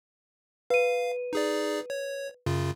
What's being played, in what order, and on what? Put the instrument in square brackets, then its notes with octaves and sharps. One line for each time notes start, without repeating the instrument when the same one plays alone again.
[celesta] B4 D#7 [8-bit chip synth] F5
[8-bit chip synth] D#4 G#4 D5
C#5
F#2 C#3 F4